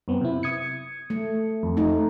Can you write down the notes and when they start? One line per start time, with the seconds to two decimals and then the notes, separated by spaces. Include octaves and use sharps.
0.08 F#2 B3 C4
0.21 C3 E4
0.43 D#6 G#6 C#7
1.10 A3
1.63 F2
1.77 A3 D#4